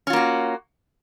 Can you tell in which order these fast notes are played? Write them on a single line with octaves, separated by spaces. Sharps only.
C#4 F4 A#3 F#4